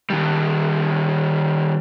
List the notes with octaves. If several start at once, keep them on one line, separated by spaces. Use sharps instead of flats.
D#3 G3